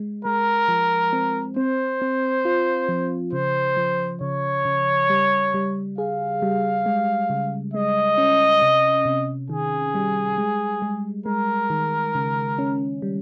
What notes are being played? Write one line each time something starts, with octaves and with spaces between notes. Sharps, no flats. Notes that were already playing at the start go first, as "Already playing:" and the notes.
Already playing: G#3
G#3 A#4
F3
C4
C4 C5
C4
F4
F3
C#3 C5
F3
C#3 C#5
C#3
G3
G3
G#4 F5
G3
G#3
C#3
G#3 D#5
C#4
C3
C3
D#3 G#4
G3
G#3
G#3
G#3 A#4
D#3
C#3
C#4
G3